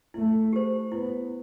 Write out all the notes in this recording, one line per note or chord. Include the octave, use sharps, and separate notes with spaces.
A3 E4
G4 C5
B3 E4